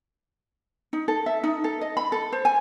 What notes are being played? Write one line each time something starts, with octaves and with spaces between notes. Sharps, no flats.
D#4
A4
E5
D#4
A4
D#5
B5
A4
C5
G#5